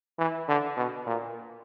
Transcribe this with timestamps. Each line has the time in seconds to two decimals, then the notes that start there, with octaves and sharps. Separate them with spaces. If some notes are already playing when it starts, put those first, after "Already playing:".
0.19 E3
0.48 D3
0.77 B2
1.07 A#2